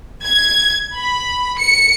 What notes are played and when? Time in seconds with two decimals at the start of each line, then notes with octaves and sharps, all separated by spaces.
0.23 G#6
0.95 B5
1.58 C#7